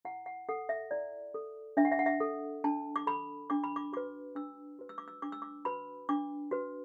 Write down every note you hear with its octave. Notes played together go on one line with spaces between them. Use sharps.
E4 F#5
F#5
A4 F#5
E5
E4 D5
A4
D4 E5
F#5
E5
F#5
E5
A4
D4 A5
D6
A4 B5
D4 D6
B5
D6
F#4 B4 D6
D4 E6
F#4 B4
E6
D6
E6
D4 D6
E6
D6
F#4 B4 B5
D4 D6
F#4 B4